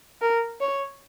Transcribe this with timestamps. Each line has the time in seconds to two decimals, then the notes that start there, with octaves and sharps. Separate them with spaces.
0.21 A#4
0.61 C#5